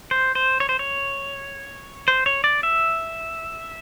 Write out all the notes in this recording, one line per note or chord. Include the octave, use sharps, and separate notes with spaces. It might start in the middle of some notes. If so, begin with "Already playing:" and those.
C5
C5
C#5
C5
C#5
C5
C#5
D5
E5